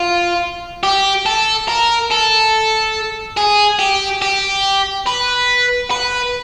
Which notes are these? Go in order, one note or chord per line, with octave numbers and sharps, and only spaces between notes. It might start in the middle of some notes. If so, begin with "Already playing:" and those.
Already playing: F4
G4
A4
A#4
A4
G#4
G4
G4
B4
B4